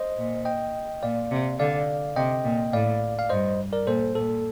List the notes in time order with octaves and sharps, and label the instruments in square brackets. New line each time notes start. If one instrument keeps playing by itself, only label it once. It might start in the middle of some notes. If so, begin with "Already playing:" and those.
Already playing: [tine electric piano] C5 D#5
[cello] A#2
[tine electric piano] D#5 G5
[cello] A#2 [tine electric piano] D5 F5
[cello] C3
[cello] D3 [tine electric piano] D5 F5
[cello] C3 [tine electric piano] D#5 G5
[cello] A#2
[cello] A2 [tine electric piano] D5 F5
[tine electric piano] F5
[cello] G2 [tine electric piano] C5 D#5
[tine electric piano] A#4 D5
[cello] A#2 [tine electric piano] A4 C5
[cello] A#2 [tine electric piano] A4